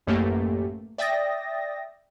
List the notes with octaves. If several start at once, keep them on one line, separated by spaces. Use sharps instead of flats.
A1 F#2 A3 A#3 G4
D5 E5 G5 D#6 A6 A#6